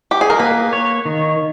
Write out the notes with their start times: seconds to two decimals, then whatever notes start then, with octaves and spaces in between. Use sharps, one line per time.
0.11 G4
0.21 G#4
0.30 A#4
0.39 A#3 B4
0.73 C#5
1.05 D#3